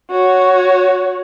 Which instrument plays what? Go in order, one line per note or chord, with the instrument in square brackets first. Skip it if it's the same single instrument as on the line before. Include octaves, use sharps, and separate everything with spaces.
[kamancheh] F#4 C#5